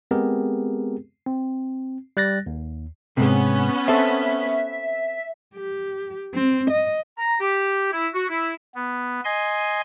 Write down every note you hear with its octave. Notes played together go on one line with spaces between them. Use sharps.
G#3 B3 C4 G4 G#4 A#4
C4
G3 F#6 A6 A#6
D#2
G#2 C3 B3 C#4
C4 A4 E5
G4
C4
D#5
A#5
G4
E4
F#4
E4
B3
D#5 G#5 C6